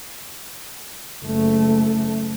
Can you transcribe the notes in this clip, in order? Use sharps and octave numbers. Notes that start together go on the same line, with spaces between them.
F#1 A3